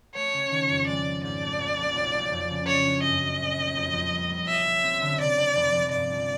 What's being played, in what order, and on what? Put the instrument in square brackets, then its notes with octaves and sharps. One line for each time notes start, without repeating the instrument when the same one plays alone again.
[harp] A3 [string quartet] C#5
[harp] C#3
D#3
F2
[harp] G#3 [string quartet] D5
[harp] G#3
[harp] G#2 [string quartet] D5
[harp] A3
A#1
A#1
B1
B1
F2
C#3
[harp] F#3 [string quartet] C#5
[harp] D4
[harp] F#2 [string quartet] D#5
[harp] F#2
A#2
B1
F2
F2
G3
G3
[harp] B1 [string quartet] E5
[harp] B1
C4
D3
[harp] C3 [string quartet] D5
[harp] C3
F1
F1
[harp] G2 [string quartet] D5
[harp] G1